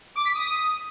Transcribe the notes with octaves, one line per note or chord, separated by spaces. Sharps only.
D6
B6
D#6